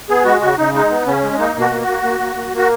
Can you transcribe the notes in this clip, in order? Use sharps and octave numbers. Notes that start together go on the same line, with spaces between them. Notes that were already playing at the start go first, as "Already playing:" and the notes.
B3 G#4
G#3 F#4
C#3 F#4
C#3 D#4
G#3 D#4
B3
C#3 C#4
G#3
A#3 D#4
B2
F#4
A#3
F#4
A#3
A#3
A#3
A#3
A#3 F#4